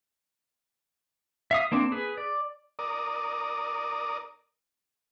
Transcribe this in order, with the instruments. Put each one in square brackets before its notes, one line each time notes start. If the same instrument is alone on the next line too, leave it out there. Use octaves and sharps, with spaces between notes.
[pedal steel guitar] E5 F5 D#6
A#3 C4 D4
G#4 B4
D5
[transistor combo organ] A#4 D5 D#6